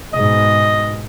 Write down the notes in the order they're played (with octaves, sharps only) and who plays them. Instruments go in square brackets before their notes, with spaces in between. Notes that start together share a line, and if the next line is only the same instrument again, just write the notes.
[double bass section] G#2 B2 [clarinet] D#5